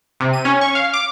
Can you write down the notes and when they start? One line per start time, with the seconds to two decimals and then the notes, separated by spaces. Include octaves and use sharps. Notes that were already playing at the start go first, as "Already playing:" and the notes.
0.20 C3
0.33 D#7
0.45 C#4
0.61 C#6
0.75 F5
0.93 D6